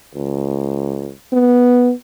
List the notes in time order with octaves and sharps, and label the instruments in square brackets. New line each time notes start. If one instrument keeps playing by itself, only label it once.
[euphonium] C#2
B3